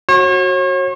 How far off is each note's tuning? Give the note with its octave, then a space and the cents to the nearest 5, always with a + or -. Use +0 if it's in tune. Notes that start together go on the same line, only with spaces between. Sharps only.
F#4 +0 C#5 -40